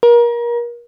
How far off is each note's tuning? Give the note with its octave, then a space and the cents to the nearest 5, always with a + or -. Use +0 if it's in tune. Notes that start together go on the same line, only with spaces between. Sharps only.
A#4 +30